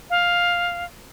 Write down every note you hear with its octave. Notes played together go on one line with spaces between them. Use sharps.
F5